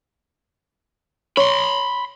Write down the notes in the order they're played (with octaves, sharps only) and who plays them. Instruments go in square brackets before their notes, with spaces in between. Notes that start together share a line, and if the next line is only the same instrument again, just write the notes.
[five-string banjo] C#5 [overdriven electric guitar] B5 C6